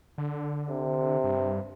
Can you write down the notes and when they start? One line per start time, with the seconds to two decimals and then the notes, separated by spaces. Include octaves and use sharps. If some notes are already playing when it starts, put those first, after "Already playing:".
0.18 D3
0.70 C3
1.24 G2